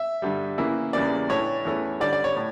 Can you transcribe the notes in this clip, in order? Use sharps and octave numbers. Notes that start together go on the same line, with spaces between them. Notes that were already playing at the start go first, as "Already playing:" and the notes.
Already playing: E5
G2 D3 G3
C#3 E3 A#3 E4
E2 C#3 E3 G3 A#3 D5
A2 E3 A3 D4 C#5
E2 E3 A3 C#4
D3 G3 C#4 D5
D5
C#5
A2